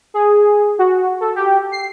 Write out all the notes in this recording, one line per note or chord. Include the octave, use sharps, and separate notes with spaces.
G#4
F#4
A4
G4
C7